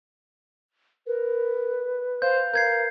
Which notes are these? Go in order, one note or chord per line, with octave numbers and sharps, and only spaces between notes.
A#4 B4
C5 F5 G6
A#4 G6 G#6 C7